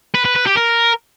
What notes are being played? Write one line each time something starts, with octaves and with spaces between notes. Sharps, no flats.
B4
B4
B4
G4
A#4